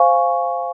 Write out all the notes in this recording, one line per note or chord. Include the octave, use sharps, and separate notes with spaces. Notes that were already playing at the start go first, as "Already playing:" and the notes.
Already playing: C5 F5 G#5 C#6